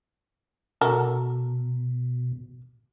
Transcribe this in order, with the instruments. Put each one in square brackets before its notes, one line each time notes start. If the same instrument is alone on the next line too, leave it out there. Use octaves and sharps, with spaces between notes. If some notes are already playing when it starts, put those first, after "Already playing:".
[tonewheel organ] B2 [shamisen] F#4 A4 A#4